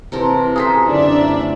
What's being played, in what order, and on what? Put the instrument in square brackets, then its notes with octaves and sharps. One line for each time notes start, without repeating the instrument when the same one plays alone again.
[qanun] C3 E3 A#4 [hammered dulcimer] C5 A5 A#5
[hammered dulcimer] F4 G#5 A#5 [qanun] G#4 A4 C5 [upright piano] D#6 B6
[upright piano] F#2 D3 [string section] D4 E5
[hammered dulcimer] A2